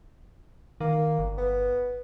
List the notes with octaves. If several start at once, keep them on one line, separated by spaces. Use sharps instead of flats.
D#3 A#3
G1
B3